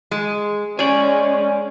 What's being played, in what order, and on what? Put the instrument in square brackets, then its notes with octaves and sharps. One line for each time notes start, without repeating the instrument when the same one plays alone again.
[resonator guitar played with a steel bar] G#3
[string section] G#3 C#4 [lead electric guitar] G#4 D5 [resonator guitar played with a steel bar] C#5